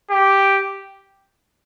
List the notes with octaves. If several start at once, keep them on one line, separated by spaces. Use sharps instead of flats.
G4